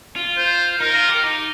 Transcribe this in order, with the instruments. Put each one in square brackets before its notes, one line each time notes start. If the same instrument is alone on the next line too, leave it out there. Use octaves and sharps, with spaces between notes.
[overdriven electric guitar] F4
[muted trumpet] C5
[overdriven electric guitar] D#4 [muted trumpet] A#4
[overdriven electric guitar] F4
G4
D#4